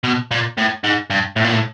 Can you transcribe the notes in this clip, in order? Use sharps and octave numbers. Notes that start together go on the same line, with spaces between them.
B2
A#2
A2
G#2
G2
A2
A#2
A2